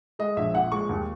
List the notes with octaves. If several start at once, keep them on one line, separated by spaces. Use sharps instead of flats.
G#3 D#5
A#1 E5
A#2 F#5
G#3 C#6
D#2